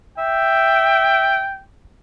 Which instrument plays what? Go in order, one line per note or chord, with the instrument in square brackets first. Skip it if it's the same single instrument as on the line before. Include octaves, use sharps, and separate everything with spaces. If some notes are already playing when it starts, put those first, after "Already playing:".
[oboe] E5 [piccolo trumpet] G5